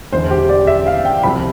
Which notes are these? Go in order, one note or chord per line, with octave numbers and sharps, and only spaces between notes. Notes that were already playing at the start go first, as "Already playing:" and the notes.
E1 E2 D3 C5
G4
D5
E5
F5
G5
C2 C3 F3 C4 B5